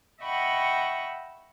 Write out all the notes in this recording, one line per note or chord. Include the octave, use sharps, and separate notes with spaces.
D#5 E5 F#5 G5 B5 C#6